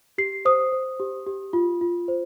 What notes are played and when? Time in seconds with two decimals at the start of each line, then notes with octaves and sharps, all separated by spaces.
0.18 G4 C7
0.45 C5 D#6
0.72 C5
1.00 G4
1.26 G4
1.53 F4
1.81 F4
2.08 C5